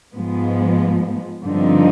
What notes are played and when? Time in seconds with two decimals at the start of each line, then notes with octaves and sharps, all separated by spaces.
0.14 G#2 F3 G#3 B3
1.44 G2 D3 F3 C4 D#4